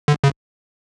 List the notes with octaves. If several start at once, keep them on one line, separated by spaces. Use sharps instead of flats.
D3
C#3